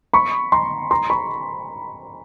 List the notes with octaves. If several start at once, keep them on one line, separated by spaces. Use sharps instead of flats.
B5 C#6
A#5 C6
A#5 C6
B5 C#6